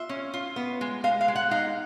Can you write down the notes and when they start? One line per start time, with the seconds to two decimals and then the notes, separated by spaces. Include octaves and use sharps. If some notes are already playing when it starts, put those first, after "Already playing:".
Already playing: F4 E5
0.09 C#4
0.34 F4
0.56 B3
0.81 G#3
1.04 G#3 F5
1.21 F5
1.28 G#3
1.36 F#5
1.51 D#4 F5